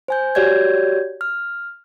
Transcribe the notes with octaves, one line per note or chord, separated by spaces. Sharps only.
C5 G#5 G6
F#4 G4 C#5 D5 G6 G#6
F6